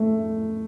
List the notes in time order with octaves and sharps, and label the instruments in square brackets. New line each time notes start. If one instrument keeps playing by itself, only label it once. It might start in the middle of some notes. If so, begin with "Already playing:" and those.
Already playing: [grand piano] A3